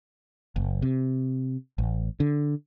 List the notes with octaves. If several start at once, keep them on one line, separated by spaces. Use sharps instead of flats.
F#1
C3
A1
D3